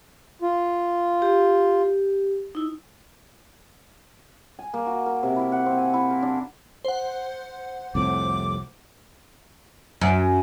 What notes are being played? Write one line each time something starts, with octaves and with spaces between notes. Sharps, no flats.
F4
G4
D#4 E4
G#5
A#3
F#4
A#4
C3
E4
F#5
C4
G#5
E4
A#4
D4
C5 F#5
C2 F2 A2 D6
F#2